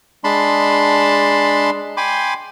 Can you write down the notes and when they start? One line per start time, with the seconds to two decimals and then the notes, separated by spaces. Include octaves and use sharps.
0.24 G#3 D4 A5 B5 C6
1.97 G5 G#5 B5 C6 D6